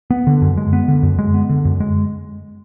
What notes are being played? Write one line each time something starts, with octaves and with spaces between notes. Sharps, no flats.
B3
D3
F#2
G#3
B3
D3
F#2
G#3
B3
D3
F#2
G#3